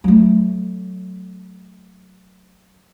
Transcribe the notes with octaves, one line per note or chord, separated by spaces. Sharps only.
F#3 A3